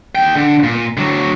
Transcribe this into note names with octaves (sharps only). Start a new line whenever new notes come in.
D#2 G5
D3
A#2
D3 F#3